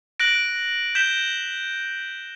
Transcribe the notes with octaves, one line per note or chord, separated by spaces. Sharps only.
F#6 A#6 D7 F#7
G6 B6 E7 G7